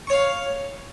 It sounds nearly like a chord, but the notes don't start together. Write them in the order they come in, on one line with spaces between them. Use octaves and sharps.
C#6 C#5 F5